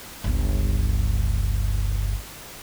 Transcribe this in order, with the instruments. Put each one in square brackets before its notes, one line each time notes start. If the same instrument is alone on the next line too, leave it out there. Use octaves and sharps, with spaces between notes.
[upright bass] G1 C#2